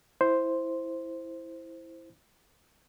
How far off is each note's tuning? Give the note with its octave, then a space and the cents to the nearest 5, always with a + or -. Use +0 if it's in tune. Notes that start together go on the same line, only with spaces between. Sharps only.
E4 +0 C5 +0